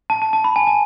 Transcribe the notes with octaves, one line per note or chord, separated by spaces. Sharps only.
A5
A5
A5
B5
G#5
A5